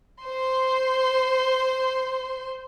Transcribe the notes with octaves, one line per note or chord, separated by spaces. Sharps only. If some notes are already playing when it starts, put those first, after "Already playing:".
C5 C6